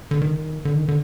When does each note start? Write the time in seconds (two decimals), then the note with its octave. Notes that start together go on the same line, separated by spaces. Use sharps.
0.11 D3
0.22 D#3
0.65 D3
0.75 D#3
0.88 D3